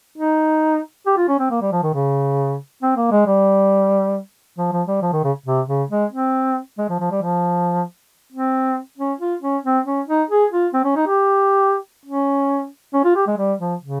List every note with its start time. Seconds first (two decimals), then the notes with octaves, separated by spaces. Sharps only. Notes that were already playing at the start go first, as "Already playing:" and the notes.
0.18 D#4
1.06 G4
1.17 F4
1.28 C#4
1.39 C4
1.51 A#3
1.61 G3
1.72 F3
1.83 D#3
1.94 C#3
2.82 C4
2.97 A#3
3.11 G#3
3.26 G3
4.58 F3
4.72 F3
4.88 G3
5.02 F3
5.13 D#3
5.24 C#3
5.46 C3
5.68 C#3
5.90 G#3
6.12 C4
6.78 G#3
6.89 F3
7.00 F3
7.11 G3
7.22 F3
8.32 C4
8.98 C#4
9.20 F4
9.42 C#4
9.64 C4
9.86 C#4
10.08 D#4
10.30 G#4
10.52 F4
10.74 C4
10.85 C#4
10.96 D#4
11.07 G4
12.05 C#4
12.94 C#4
13.04 F4
13.16 G4
13.27 G#3
13.38 G3
13.60 F3
13.82 C#3